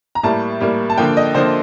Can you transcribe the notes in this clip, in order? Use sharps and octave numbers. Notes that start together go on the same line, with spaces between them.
A#5
A2 G3 A#3 A5
A2 G3 A#3
A5
D3 F3 A#3 G5
D#5
D3 F3 A#3 C5